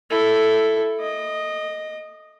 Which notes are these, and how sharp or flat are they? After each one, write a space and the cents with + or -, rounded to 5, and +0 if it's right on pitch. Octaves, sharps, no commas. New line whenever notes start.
E4 +5 A4 +0
D#5 +0 D6 +45